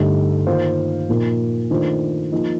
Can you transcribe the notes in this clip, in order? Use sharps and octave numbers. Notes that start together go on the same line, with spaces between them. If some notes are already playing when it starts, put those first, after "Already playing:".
Already playing: G2 D3 A3 D#4 A4
D#3 A#3 F4 C5 F5
A#2 F3 A#3 D#4
D#3 A3 D4 F4 C5
F3 A#3 D#4